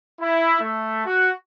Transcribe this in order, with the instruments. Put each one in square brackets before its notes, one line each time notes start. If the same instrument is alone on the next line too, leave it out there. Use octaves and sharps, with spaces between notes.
[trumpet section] E4
A3
F#4